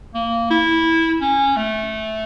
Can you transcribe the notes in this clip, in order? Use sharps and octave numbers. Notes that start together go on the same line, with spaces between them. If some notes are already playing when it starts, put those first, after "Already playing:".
A#3
E4
C#4
A3